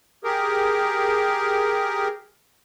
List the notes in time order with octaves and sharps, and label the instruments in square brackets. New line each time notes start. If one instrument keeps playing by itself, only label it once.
[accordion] G4 G#4 A#4